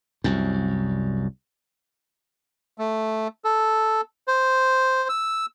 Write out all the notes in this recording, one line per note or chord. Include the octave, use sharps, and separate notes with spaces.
C2 F#2
A3
A4
C5
E6